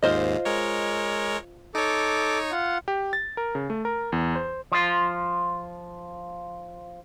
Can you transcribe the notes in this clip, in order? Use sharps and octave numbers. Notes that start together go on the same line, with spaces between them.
D#2 G#2 F4 C5 D#5
G#3 A#4 C#5
D#4 A4 C#5 D6
F4 F#5
G4
A6
A#4
C#3
A3
A#4
E2
C5
F3 F4